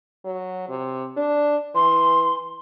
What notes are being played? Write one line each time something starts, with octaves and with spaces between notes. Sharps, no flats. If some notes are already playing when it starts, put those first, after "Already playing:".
F#3
C3
D4
E3 C6